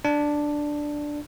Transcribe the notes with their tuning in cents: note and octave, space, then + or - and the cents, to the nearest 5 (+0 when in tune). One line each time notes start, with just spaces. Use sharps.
D4 +5